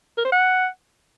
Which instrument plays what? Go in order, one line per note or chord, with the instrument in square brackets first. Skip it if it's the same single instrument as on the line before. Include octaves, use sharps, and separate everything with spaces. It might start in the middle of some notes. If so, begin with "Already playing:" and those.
[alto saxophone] A#4
C5
F#5